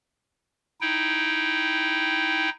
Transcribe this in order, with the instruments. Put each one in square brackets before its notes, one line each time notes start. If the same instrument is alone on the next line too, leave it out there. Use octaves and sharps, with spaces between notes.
[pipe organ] D#4 E4 G5